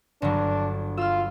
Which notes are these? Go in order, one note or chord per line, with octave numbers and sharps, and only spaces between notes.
G1 F#3 D4
F4 E6 F6